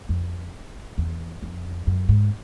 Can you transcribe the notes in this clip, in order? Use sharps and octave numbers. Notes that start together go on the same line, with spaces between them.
F2
E2
F2
F#2
G#2